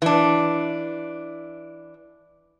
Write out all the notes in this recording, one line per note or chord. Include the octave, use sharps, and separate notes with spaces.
E3 D4